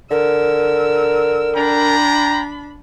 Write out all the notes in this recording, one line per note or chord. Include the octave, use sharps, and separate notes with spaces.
D3 A#4 E6
D4 G5 A#5 B5